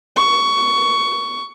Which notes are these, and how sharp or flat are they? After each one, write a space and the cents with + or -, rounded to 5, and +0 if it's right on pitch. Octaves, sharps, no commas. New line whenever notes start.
C#6 +15